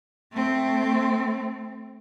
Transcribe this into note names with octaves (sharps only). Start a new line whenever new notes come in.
A3 C4